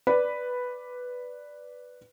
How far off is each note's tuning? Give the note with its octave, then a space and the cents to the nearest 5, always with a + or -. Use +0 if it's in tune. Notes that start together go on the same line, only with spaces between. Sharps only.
B4 +0 D5 +0